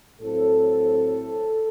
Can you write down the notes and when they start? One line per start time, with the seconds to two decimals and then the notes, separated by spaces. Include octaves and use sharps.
0.21 A2 F#3 C4 A4